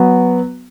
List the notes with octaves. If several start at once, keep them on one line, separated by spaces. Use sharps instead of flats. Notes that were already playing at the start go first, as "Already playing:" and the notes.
Already playing: F#3 B3 F#4